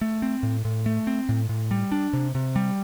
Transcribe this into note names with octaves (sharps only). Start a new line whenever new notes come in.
A3
C4
A2
A2
A3
C4
A2
A2
G3
D4
C3
C3
G3